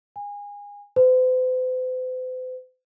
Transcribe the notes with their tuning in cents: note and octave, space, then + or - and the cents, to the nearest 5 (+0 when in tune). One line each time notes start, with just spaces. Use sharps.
G#5 -30
C5 -45